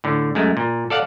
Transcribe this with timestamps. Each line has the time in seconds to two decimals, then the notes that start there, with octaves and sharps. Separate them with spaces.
0.04 A2 D3
0.35 F#2 G#3 A3
0.57 A#2
0.90 A4 D5 F5 F#5